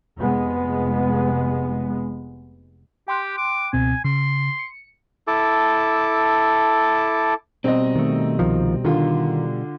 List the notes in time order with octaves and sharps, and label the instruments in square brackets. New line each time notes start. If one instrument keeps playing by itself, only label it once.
[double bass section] F1 G#3 B3
[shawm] G4 [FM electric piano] G5 C6 F#6
[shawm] D6
[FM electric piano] C#2 B2 C4 [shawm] G#5
[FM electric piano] C#3 [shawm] C6
[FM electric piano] C#7
[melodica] E4 A4 A5 D6
[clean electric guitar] B2 G3 D#4 [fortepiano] C4 D#5
[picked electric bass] D#3 A3
C2 D#3 F3
[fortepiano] D3 F4 [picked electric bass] D#3